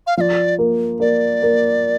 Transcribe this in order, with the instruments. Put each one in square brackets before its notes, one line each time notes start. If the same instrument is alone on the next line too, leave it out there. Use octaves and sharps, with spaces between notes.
[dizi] F5
[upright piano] F3 [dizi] D5 F5
[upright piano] A#3
[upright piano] A#3 [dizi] D5
[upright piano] A#3